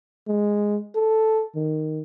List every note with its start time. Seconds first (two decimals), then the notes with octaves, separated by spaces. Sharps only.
0.28 G#3
0.95 A4
1.55 D#3